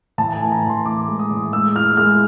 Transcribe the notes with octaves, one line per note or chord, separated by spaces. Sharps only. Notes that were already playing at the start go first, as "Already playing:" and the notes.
A2 A5
G#5
E3
A#5
A2
C6
E3 D6
G#3
D#6
A2
G#3 E6
E4 F6
G#3 F6